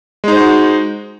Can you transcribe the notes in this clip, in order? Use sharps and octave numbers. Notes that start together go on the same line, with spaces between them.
G#3 D#4 F#4 C5